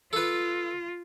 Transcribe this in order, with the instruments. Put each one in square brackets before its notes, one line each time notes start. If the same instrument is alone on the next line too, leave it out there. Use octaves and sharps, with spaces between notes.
[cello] F4 [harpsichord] A4 B4